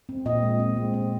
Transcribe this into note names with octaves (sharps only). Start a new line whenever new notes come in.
C4
A#2 D#5
G#3
C4
G#3
C4